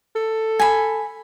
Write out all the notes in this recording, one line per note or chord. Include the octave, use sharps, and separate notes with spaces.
A4
G#5 B5